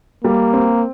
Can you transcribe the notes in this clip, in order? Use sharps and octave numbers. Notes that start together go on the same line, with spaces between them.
G3 A#3
C4